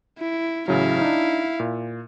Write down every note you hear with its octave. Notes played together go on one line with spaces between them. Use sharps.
E4
A1 C#3 F#3 E4 F5
D4 D#4
A#2